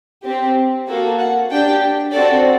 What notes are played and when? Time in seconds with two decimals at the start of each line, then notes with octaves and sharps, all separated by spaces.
0.24 C4 G4
0.88 A#3 F#4 A4
1.19 F#5
1.51 D4 G4 G5
2.13 C4 F#4 A4 D5